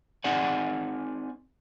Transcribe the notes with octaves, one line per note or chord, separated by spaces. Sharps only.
C4 D#4 G#4 D5 F#5 G#5